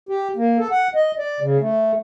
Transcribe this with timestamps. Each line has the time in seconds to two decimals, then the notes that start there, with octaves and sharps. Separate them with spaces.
0.09 G4
0.36 A#3
0.59 A4
0.71 F#5
0.95 D#5
1.18 D5
1.40 C#3
1.60 A3